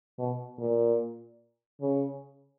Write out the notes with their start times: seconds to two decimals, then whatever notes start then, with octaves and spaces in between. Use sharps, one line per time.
0.18 B2
0.58 A#2
1.81 C#3